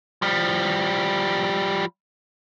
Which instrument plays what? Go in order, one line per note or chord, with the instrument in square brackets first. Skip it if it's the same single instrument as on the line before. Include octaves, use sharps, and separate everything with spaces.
[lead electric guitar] F3 G3